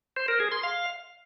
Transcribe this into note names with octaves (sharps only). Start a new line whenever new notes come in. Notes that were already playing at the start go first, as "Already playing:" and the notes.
C5
A#4
G#4
C6
F5